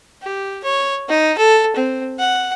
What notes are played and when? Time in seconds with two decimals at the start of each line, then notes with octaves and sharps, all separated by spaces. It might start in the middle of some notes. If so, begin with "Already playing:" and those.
0.22 G4
0.64 C#5
1.09 D#4
1.38 A4
1.76 C4
2.19 F#5